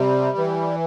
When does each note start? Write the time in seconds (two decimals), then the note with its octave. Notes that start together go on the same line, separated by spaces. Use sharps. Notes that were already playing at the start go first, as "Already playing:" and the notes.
Already playing: C3 G3
0.37 E3